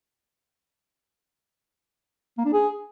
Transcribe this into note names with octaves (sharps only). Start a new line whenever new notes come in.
A#3
D4
G#4